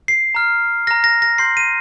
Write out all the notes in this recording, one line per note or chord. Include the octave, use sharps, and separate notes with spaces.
C7
A#5 F6
A#5 F6 A#6
A#6
A#6
C6 G6 C7
D#7